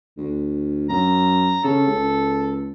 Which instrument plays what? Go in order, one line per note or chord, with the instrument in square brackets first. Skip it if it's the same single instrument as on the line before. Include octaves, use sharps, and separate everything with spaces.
[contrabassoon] D2
[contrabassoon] F#2 [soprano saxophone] A#5
[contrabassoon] C#3 [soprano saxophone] A4
[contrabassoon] C#2